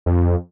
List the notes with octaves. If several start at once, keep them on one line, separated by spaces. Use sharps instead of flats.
F2